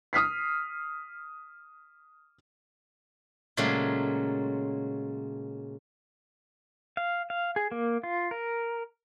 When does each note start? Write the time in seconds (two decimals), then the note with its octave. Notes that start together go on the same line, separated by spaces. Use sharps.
0.13 D#6 F6 B6 C7
3.57 A#2 C#3 F#3 G#3 A3
6.97 F5
7.30 F5
7.56 G#4
7.71 A#3
8.03 F4
8.31 A#4